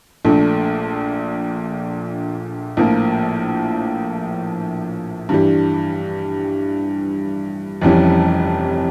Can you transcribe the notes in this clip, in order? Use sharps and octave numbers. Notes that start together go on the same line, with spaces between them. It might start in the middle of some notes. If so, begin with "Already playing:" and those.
A#1 A#2 A3 D4
A#1 A2 F3 A#3
G2 E3 G3
F1 F2 E3 G3 C#4